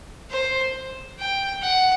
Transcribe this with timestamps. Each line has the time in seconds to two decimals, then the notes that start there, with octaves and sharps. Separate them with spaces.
0.30 C5
1.19 G5
1.62 F#5